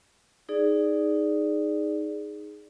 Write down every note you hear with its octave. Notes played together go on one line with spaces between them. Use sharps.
D#4 G#4 D5